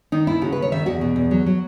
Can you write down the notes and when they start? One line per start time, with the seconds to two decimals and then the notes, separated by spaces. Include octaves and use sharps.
0.12 D#3 D#4
0.27 D#2 E4
0.41 C#3 F#4
0.52 B4
0.56 D#2
0.62 C#5
0.72 D#3 E5
0.86 E2 F#4
1.01 B2
1.16 E2
1.31 F#3
1.46 F#3